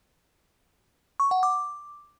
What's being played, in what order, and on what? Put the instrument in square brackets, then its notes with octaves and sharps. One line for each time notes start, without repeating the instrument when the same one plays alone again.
[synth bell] C#6
F#5
D6